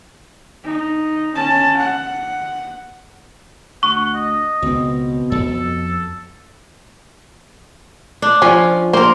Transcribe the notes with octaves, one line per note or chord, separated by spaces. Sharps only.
D#4
C#4 A5
F#5
D2 F#5 C#6
D#5
C#2 B2 C4
F2 A4
D4
F3 C#4
A#3 A#4 C5